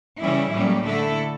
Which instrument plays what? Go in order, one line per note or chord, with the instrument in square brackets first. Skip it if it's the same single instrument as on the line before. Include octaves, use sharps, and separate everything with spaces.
[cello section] C#3 E3 G3 C#4 E4
A2 G3 A#3 C#4
D3 A3 E4 A4